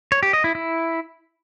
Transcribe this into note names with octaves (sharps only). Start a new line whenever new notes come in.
C#5
G4
D#5
E4
E4